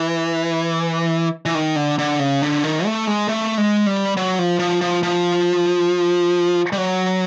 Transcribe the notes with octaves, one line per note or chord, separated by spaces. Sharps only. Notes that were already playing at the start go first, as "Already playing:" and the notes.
Already playing: E3
E3
D#3
D3
D3
C#3
D3
D#3
A3
G#3
A3
G#3
G3
F#3
F3
F3
F3
F3
G3
F#3